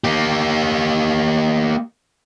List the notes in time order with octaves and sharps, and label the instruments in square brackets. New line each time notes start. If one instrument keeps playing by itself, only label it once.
[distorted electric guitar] A#3 G4